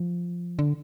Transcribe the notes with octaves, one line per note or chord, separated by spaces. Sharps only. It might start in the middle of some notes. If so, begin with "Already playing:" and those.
Already playing: F3
D3